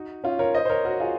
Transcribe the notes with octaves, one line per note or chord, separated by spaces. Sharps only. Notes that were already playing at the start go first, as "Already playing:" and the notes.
Already playing: D#4 F#4
C#4 F4
A#4 C#5
C5 D#5
C5
A#4 C#5
F#4 A#4
F4 G#4